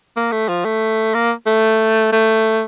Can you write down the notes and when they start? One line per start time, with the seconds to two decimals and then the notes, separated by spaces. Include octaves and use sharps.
0.16 A#3
0.32 A3
0.49 F3
0.65 A3
1.14 A#3
1.46 A3
2.12 A3